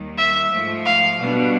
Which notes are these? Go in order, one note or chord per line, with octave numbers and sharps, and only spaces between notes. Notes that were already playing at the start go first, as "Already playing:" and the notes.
Already playing: D#2 D#3 G3
E5
G#2 F3 A3
F5
B2 G3 B3 D4